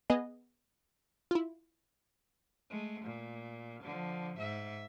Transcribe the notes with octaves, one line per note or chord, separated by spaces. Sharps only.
B3 G#4 D#5
E4 F4
G#3 A3
A#2
D3 F3
G#2 E5